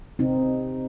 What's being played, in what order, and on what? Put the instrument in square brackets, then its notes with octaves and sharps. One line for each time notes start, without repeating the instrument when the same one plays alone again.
[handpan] C3 C4 D#4